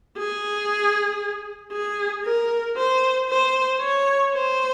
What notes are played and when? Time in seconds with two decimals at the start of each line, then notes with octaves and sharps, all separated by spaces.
0.18 G#4
1.73 G#4
2.25 A#4
2.77 C5
3.29 C5
3.81 C#5
4.34 C5